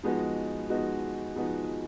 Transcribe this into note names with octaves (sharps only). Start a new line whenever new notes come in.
F3 G#3 B3 D#4 F#4
F3 G#3 B3 D#4 F#4
F3 G#3 B3 D#4 F#4